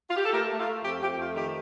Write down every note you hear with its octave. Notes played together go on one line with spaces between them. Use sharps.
F4
G4
A4
A3 G4 A#4
A3
F4 A4
A3
F2 G4
F2 G4
A3 F4
D#3 G4